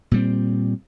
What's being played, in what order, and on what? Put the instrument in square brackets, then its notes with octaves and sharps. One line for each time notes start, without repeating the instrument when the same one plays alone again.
[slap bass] A#2 G3 C4